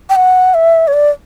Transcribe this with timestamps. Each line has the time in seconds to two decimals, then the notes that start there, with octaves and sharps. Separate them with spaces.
0.10 G5
0.16 F#5
0.54 E5
0.87 C#5
0.93 D5